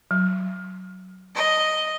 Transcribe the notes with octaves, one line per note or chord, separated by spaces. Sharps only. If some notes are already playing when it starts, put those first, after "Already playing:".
F#3
D#5